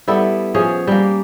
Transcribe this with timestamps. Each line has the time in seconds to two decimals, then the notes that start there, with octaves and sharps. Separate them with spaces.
0.08 G3 B3 E4 A4
0.54 F3 C#4 G#4
0.87 G3 A#3